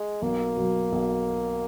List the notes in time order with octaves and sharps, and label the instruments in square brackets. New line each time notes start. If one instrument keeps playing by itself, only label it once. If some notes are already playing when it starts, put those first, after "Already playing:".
Already playing: [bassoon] G#3
[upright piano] B1 [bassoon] A#3
[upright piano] B2 F#3
B1